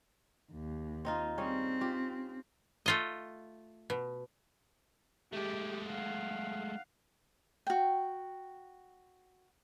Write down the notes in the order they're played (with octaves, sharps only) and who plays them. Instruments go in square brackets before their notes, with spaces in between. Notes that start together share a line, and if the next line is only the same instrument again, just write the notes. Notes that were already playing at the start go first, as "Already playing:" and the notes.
[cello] D#2
[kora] C4 D#4 F4
[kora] G3 C#4 G#4 [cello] C4
[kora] F4 G4
[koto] A3 F4 D#5
B2
[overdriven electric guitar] G#3 A3 [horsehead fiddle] G4
[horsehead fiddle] F5 F#5
[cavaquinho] F#4 G5